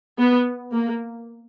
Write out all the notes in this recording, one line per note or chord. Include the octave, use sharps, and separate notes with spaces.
B3
A#3